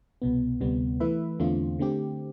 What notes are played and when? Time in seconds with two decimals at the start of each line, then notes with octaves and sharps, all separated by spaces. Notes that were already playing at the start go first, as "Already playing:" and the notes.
0.22 C2 B2 B3
0.61 D2 C3 G3 B3
1.00 E3 A3 E4 B4 E5
1.40 E2 D3 A3 C4 F4
1.79 D3 A3 C4 G4